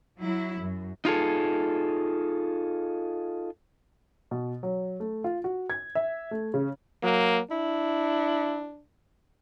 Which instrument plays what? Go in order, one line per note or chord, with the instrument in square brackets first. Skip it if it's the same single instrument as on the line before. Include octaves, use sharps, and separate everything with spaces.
[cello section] F#3 E4
F#2
[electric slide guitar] D#4 F4 G#4 A4
[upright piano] B2
F#3
A3
F4
F#4
G#6
E5
A3
C#3
[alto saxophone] F#3 [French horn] A#3
[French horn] D4 [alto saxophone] E4